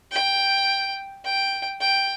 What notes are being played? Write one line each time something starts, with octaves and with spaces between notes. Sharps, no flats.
G5
G5
G5